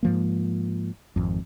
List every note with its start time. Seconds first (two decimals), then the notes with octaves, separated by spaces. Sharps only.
0.03 G#2 F3 A#3
1.16 G#1 F2